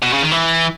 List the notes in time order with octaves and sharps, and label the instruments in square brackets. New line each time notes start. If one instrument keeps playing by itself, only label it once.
[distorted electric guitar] B2
C#3
D#3
E3